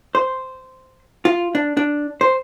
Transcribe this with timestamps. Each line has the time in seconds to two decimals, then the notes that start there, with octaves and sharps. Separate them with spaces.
0.15 C5
1.25 F4
1.55 D4
1.77 D4
2.21 C5